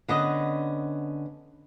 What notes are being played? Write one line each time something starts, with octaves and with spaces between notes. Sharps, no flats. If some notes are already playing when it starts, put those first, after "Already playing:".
D3 B3 C#4 D#5